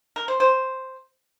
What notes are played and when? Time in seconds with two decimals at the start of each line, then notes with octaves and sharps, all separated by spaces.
0.16 A#4
0.28 C5
0.40 C5